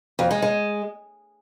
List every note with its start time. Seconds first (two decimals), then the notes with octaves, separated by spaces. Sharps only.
0.19 F2
0.31 G#3
0.42 G#3